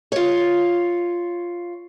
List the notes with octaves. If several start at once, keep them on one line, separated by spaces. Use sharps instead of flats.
F4 C#5